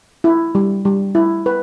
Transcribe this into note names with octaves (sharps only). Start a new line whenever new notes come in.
E4
G3
G3
E4
B4